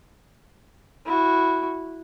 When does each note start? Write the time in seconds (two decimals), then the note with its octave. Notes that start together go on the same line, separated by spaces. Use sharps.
1.06 E4 F#4